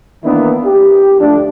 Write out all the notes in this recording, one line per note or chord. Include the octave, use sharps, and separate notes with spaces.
D#3 E3 A#3 B3 D4 E4
G4
D2 F3 A3 D4